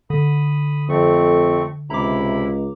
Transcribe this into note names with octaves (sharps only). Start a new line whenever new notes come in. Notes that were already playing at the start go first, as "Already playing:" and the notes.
D3 B5 D#6
F2 A3 C4 C#6
C#2 C3 E4 A#5 B5 D6